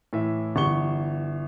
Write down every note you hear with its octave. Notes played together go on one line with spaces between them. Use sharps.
A2 E3 E5
G1 E3 C#6 G7